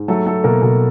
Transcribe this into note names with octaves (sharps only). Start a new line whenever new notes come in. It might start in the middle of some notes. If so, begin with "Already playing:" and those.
Already playing: G#2
F#3 A3 A4
A3 A4
B2 A#3 A#4
B2